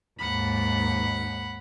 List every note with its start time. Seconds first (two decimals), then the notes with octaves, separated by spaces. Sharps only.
0.18 D#2 G#2 F#5 B5